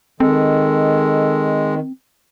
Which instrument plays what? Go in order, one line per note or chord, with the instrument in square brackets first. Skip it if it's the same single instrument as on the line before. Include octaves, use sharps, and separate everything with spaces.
[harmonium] D#3 [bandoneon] G#3 [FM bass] C4 [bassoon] A4